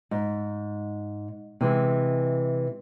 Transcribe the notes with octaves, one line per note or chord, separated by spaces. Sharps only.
G#2
C3 E3 G#3